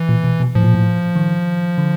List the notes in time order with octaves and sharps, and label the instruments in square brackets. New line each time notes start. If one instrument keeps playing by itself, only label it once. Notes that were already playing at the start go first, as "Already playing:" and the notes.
Already playing: [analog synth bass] E3
[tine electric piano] A#2
B2
B2
[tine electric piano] A2 [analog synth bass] F3
[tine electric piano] A#2
A2
D#3
D3